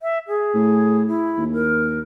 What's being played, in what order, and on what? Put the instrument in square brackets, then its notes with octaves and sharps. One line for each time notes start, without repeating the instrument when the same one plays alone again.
[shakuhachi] E5
G#4
[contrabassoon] A2
[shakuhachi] E4
[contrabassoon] D#2
[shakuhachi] A#4